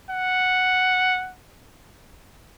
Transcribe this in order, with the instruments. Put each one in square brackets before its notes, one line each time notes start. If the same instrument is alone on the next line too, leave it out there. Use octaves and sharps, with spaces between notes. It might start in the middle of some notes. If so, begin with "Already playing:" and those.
[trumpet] F#5